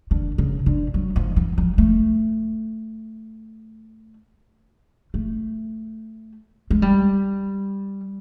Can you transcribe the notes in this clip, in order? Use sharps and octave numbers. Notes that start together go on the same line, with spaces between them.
D3
C#3
D3
F#3
F3
E3
F3
A3
A3
G#3
G3